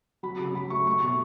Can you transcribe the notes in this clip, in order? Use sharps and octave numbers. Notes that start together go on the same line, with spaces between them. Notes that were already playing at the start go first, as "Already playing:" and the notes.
F#3 B5
C#3
F#3 B5
A3 C#6
A3 C#6
B2 C#6